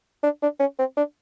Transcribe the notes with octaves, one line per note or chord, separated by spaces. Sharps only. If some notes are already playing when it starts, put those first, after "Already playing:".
D4
D4
C#4
C4
D4